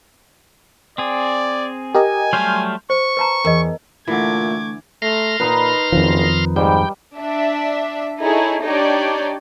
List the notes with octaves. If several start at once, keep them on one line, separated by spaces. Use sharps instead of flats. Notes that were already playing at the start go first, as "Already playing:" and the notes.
C4 G#4 D5
G4 A#4 D#5 G#5
F#3 G3 A3 C6 F6 G6
C5 C#6
B4 A5 A#5
E2 A#4 D#5
A#2 D3 E3 A3 D6 G#6
A3 A#5 C6 F6
A#2 D#4 B4
F#1 F2 D#3 F3
G#2 G3 G5
D4 E5
D#4 E4 G#4 A4 C#5
D4 D#4 G4 C#5 D5